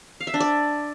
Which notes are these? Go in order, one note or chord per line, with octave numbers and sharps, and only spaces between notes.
F5
E5
D4
D5